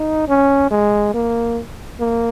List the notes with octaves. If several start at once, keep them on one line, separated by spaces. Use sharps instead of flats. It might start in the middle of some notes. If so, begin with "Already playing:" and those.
Already playing: D#4
C#4
G#3
A#3
A#3